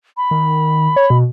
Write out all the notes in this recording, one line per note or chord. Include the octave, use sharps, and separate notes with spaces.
B5
D#3
C#5
B2